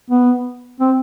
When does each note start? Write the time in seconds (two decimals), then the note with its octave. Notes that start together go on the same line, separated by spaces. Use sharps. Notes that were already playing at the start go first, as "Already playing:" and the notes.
0.10 B3
0.80 C4